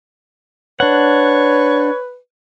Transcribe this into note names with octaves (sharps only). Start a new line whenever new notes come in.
D4 B4 C#5 F#5